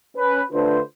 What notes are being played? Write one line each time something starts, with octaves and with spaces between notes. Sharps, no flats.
C#4 B4
D3 A3 D4 F4 B4 C5